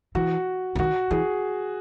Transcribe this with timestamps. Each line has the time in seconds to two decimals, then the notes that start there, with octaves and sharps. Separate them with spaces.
0.15 E3 F#4
0.75 C#3
0.79 D#3 F#4
1.11 E3 G#4